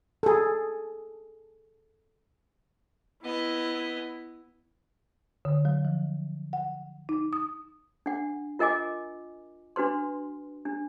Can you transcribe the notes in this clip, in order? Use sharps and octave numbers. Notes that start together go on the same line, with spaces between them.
G#4 A4
B3 E4 D#5
D3
F#3
F3
F#5
D#4
D#6
D4 F#5
F4 A#4 D#5 G#5 D6
D4 F#4 B4 C6
D4